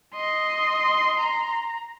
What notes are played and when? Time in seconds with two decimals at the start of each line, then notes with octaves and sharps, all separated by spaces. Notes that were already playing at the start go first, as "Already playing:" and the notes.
0.15 D#5 C6
1.19 A#5